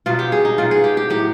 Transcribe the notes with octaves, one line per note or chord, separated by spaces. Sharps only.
B2 F#3 F4
G4
G#4
D#4
B2 F#3 F4
G#4
G4
G4
A2 F#3 G4